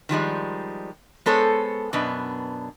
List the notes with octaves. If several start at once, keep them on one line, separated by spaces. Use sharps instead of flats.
D#3 F3 G3 G#3
G#3 B3 A4 C5 C#5
F#2 B2 B3 D4